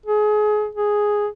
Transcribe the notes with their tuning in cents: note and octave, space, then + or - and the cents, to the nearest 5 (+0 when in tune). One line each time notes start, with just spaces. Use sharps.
G#4 +30
G#4 +0